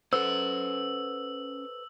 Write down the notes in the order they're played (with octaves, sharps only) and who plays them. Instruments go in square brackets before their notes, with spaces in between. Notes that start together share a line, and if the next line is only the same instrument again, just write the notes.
[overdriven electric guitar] C#4 F#5 [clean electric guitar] A4 B4 C5 [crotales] E6